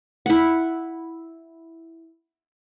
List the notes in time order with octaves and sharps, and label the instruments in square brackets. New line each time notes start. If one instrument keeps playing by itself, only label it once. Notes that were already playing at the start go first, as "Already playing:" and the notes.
[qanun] E4 F#5